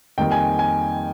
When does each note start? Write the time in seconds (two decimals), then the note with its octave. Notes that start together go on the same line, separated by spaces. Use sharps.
0.18 F2 D#3 G3 A#3 G5
0.32 G#5
0.59 G#5